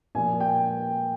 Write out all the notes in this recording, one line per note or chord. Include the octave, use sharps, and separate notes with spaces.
A#2 F3 G#5
G5